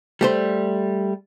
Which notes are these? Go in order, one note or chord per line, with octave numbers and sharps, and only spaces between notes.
G3 A3 C5